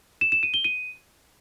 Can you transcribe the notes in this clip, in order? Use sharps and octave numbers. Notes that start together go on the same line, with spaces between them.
E7
E7
D#7
G7
D#7